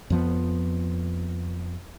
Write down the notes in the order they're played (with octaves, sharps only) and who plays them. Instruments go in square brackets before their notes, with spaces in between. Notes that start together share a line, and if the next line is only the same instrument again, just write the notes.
[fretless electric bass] F2 F3 B3